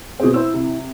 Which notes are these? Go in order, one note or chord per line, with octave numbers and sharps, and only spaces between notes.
B2 C4 G#4
E4 C5 E6
C3